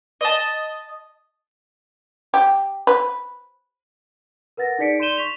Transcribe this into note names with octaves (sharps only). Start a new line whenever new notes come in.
D#5 A5
G4
B4
A#4 B4 F#5 A6 A#6
D#4 G#4 D5 B6 C#7 D7
D5 C6 G6 D#7 E7 G7
C#6 B6 F7